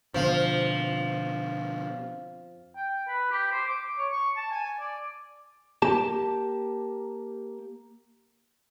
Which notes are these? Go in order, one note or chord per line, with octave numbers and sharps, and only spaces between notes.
F2 B2 D3 F3 C5 F5
G5
B4
G4
C5
D6
C#5
C#6
A5
G#5
D5
A#3 G4 A5